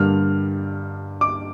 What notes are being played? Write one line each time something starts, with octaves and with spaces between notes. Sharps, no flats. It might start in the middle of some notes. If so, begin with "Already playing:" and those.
Already playing: G2 D3 G3 A#3 F6
D6